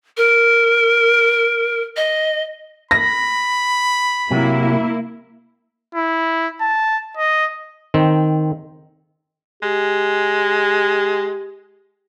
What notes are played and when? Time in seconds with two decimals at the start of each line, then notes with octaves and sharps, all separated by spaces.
0.17 A#4
1.97 D#5
2.91 B5 A#6
4.31 C3 F#3 A#3 E4
5.95 E4
6.61 A5
7.17 D#5
7.94 D#3 C4
9.63 G#3 G4